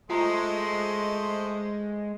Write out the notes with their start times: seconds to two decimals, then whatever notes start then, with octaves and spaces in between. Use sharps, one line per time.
0.10 G#3 A3 F4 C5 D#5 G#5 A#5